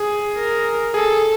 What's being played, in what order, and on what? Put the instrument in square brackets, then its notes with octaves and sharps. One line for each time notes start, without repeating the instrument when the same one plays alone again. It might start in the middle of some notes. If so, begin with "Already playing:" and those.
Already playing: [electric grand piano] G#4
[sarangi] A#4
[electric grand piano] G#4 [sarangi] A4